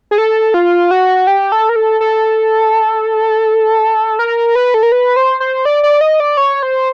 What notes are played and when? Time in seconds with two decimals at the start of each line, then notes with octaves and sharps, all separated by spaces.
0.11 G#4
0.18 A4
0.54 F4
0.91 F#4
1.27 G4
1.52 A4
1.69 A#4
1.76 A4
2.01 A4
4.19 A#4
4.55 B4
4.74 A4
4.83 A#4
4.92 B4
5.16 C5
5.40 C5
5.65 D5
5.83 D5
6.01 D#5
6.20 D5
6.37 C#5
6.63 C5